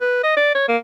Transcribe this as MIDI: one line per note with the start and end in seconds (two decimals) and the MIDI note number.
0.01 0.21 71
0.24 0.33 75
0.37 0.53 74
0.55 0.68 73
0.69 0.77 58